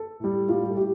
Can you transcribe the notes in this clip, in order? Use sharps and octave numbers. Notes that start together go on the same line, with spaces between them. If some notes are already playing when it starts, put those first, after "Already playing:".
Already playing: A4
A2 G3
A2 G3 F4
G4
A4
A2 G4